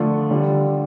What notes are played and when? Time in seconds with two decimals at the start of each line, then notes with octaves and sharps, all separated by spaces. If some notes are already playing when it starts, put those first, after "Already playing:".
Already playing: D3 F3 A3 D4 F4
0.31 D3 G3 D4 F4